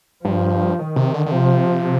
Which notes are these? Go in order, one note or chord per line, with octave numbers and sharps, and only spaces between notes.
G2 F3
D#3
C3
D3
D3
C3 F3